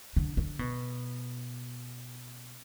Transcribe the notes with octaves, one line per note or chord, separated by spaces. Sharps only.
D3
D3
B2